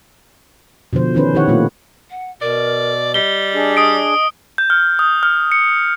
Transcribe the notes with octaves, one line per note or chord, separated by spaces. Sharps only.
B2 D3 F3 C5
D#3 E3 C#4 B4 C5
D#3 E4 G4 C#5 F#5
A#2 A3 C4 F4
F#5
B2 A#4 D5
G3 D#5 G7
D4 G#4
D#6 D7
G6
F6
D#6
F6
C#7